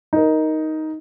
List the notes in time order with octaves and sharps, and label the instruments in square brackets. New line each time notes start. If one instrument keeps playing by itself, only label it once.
[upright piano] D#4 A#4